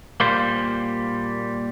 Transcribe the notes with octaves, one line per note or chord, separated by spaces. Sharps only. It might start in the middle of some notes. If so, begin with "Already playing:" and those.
A#2 G3 A#3 C5